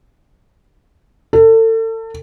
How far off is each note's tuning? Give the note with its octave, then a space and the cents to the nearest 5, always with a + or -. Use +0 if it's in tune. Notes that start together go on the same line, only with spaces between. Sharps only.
A4 +35